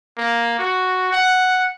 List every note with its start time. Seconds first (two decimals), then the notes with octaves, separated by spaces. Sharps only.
0.17 A#3
0.59 F#4
1.12 F#5